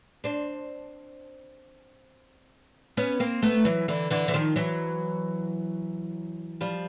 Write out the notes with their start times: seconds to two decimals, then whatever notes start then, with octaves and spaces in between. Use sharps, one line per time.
0.24 C4 D4
2.97 B3 C#4
3.20 A#3 C4
3.42 A3 B3
3.65 E3 F#3
3.88 D3 E3
4.10 D3 E3
4.28 E3
4.34 D#3 F3
4.56 E3 F#3
6.61 F3 G3